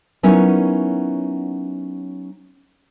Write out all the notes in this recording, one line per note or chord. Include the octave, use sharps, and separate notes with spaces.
F#3 B3 C#4 D#4 E4 A#4